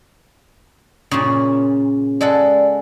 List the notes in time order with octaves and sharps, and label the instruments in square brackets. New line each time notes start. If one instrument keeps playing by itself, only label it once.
[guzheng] A#2 C#3
[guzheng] G#3 A4 F#5 [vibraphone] D5